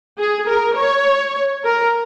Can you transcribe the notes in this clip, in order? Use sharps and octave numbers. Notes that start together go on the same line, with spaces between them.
G#4
A#4
C#5
A#4